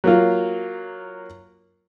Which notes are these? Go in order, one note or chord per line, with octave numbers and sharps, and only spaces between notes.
F#3 A#3 F4